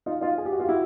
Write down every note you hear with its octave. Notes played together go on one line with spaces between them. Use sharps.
D#4 F4
D#4 F4
G#4
G4
F#4
F4 G4
E4 F#4